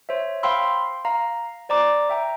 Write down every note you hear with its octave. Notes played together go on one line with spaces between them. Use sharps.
C5 C#5 E5
C5 F5 G5 B5 C6 E6
F5 A#5
C5 D5 A#5 D6
E5 G5 A#5